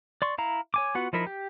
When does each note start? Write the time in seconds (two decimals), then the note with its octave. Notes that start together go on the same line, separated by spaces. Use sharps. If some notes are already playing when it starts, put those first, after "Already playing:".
0.22 D5 C6 C#6
0.38 E4 F5 A#5
0.74 C#5 G#5 D6
0.95 B3 F4 F#4 F#5
1.13 F3 D#4 E4 A#4 B5
1.27 G4